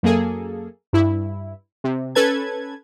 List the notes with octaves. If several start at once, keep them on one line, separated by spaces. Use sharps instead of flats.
F#2 A#3 G#4 A4
G2 E4
C3
C#4 A4 B4 A5 G#6